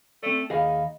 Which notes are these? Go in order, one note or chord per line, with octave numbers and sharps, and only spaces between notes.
A3 C4 D5
D#2 D#4 G#4 D#5 F5 B5